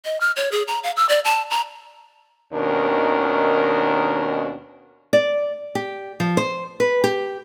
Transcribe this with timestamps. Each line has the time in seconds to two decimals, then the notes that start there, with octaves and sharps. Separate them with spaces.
0.05 D#5
0.21 F6
0.36 C#5
0.52 G#4
0.68 A#5
0.84 F5
0.97 E6
1.09 D5
1.25 A5
1.50 A#5
2.53 D#2 B2 D#3 C#4 D4 A#4
5.13 D5
5.75 G4
6.20 F3
6.37 C5
6.80 B4
7.04 G4